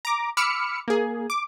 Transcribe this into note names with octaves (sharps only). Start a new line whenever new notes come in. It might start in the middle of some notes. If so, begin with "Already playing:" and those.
A#5 D6
B5 D6 E6 F6 C#7
A#3 G#4
D6